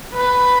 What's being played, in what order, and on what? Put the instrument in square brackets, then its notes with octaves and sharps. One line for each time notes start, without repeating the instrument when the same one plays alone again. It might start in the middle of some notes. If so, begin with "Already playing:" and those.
[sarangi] B4